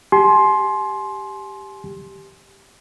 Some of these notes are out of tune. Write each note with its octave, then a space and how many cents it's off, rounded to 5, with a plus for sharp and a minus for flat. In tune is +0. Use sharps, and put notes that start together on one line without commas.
G4 +0 G#5 +40 C6 +10